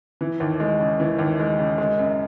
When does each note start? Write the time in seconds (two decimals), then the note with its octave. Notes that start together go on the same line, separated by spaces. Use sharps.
0.21 E3
0.40 D#2
0.60 G#3
0.80 C#3
1.00 E3
1.19 D#2
1.40 G#3
1.59 C#3
1.78 G#3
1.99 F#2